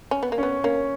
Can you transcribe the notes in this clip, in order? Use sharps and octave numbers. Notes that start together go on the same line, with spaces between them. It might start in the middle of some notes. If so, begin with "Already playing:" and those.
C#4
B3
A#3
B3 C#4
A#3 C#4